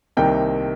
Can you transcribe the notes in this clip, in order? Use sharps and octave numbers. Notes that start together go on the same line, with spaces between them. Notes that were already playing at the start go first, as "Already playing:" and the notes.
C2 C3 D#3 A#3 D#4 G5